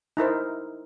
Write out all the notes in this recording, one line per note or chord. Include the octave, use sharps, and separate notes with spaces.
D#4 E4 A#4 C5